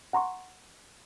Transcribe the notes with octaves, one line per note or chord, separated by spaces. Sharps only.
F#5 A#5 C6 C#6